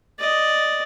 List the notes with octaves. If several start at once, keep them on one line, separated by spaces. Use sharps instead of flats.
D5 D#5